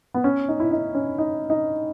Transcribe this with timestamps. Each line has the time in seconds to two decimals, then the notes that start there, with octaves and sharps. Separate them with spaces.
0.14 B3
0.24 C#4
0.48 D#4
0.60 E4
0.71 D#4
0.95 C#4
1.18 D#4
1.50 D#4